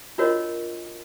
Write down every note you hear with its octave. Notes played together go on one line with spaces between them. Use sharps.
D4 F4 F#4 A#4 C#5 D#5